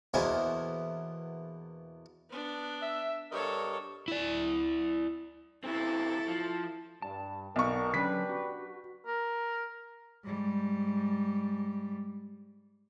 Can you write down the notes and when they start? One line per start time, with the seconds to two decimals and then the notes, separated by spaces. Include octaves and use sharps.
0.14 E2 B2 A#3 E4 C5 G#5
2.29 B3 D4
2.82 E5
3.32 G2 A4 A#4 C#5 D#5
4.08 E4 D5
5.64 C#3 C4 E4 A4
6.28 F3
7.02 G2 A5
7.56 B1 B2 A#4 D5 C#6
7.94 D3 F#3 C#4 D4 G4 B4 B6
8.29 F#4
9.06 A#4
10.24 G#2 G3